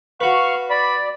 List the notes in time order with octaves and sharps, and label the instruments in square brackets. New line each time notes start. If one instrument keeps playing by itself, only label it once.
[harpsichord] F#4 B4 [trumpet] F5 [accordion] C#6
[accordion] D5 [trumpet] B5